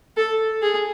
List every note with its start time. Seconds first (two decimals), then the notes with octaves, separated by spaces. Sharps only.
0.17 A4
0.62 G#4